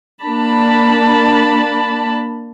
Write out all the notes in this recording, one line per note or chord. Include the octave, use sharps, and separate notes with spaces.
A#3 D4 A5 B5